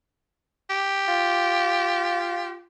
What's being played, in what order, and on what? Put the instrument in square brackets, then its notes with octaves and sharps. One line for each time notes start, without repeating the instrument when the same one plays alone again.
[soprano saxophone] G4
[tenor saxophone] F4